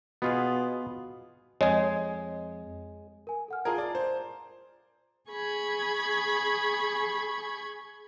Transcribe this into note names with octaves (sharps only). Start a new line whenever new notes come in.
B2 B3 F4 G#4
F2 G#3 G#4 C#5 D#5
A#4 G#5
A4 F#5 F6
F4 G#4 A#4 A5 A#5 G#6
D5
C5
G#4 B5 C#6 G#6